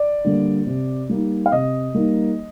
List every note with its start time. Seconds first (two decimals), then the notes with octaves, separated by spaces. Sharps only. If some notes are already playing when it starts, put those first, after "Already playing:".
Already playing: D5
0.24 D3 G3 A#3
0.67 C3
1.09 G3 A#3 D#4
1.46 F5
1.52 C3 D#5
1.94 G3 A#3 D#4